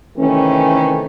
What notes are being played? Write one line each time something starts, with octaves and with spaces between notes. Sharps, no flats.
C3 D#3 E3 A3 C#4